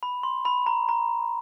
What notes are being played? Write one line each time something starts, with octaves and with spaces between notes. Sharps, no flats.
B5
C6
B5
A#5
A#5